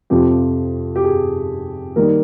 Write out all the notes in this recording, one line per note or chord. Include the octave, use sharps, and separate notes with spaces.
F2 C3 F3 G4
G4
G#4
D#3 G3 A#3 D#4 A#4